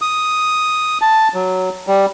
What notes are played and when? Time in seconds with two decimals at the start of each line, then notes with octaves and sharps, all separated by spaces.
0.02 D#6
1.02 A5
1.34 F#3
1.87 G3